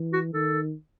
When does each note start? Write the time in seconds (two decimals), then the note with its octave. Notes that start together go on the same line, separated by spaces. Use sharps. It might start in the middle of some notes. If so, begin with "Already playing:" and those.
Already playing: E3
0.13 F#4
0.34 D#3 A4